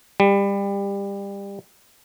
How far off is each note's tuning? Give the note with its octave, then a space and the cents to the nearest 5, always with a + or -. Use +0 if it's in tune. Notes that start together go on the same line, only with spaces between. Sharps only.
G3 +25